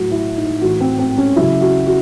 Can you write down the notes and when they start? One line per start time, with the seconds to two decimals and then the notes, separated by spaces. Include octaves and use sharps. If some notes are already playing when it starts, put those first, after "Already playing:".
Already playing: A2 F#3 F#4
0.11 E4
0.37 D#4
0.61 A2 E3 F#4
0.80 C4
0.99 C4
1.18 C#4
1.36 C#3 F#3 E4
1.61 F#4
1.86 F#4